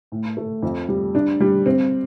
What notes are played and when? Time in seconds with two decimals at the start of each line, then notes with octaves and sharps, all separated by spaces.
0.12 A2
0.37 A3
0.62 F2
0.89 G3
1.15 D4
1.40 G3
1.66 C4